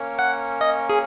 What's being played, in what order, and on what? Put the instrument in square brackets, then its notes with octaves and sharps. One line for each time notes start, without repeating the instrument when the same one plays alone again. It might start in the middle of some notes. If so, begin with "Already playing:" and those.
Already playing: [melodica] A#3 C#4 A#4 C#5
[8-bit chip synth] F#5
D#5
G#4